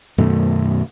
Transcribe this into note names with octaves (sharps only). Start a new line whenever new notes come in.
F#2 B2 D#3 A3